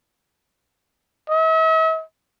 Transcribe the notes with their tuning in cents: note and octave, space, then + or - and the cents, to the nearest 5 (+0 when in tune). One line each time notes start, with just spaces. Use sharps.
E5 -45